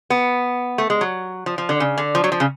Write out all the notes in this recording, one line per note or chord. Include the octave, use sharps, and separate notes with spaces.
B3
A3
G#3
F#3
F3
F3
D3
C#3
D3
F3
F#3
F3
C#3